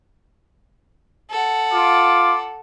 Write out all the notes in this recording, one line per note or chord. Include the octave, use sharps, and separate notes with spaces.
A4 F#5
F4 D6